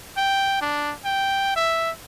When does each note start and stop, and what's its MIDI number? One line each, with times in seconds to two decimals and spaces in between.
0.17 0.60 79
0.61 0.93 62
1.05 1.53 79
1.56 1.90 76